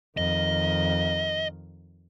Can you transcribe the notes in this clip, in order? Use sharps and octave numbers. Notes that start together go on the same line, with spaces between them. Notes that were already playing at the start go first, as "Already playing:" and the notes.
F2 D#3 D#5